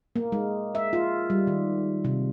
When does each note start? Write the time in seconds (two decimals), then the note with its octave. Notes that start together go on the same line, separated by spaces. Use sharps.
0.16 A#3
0.32 G#3
0.75 E5
0.93 F4
1.30 G3
1.47 D#3
2.05 C3